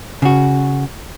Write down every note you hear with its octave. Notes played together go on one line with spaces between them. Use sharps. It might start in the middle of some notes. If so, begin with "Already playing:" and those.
C#3 F#4